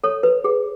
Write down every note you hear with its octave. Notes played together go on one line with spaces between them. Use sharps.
A4 C#5
B4
G#4